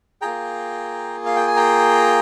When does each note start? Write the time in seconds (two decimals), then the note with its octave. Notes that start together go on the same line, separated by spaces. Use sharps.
0.22 A#3 F4 G#4 G5 A#5
1.26 F5
1.36 G5
1.47 G#5
1.56 G5 A#5